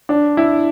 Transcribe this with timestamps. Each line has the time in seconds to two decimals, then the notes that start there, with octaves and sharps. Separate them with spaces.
0.09 D4
0.37 E4